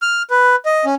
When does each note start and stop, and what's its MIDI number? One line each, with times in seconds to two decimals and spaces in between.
0.02 0.22 89
0.30 0.56 71
0.66 0.85 75
0.85 0.95 61